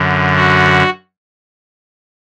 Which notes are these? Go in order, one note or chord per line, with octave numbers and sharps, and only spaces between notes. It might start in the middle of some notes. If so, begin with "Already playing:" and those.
Already playing: F#2 D3
F#4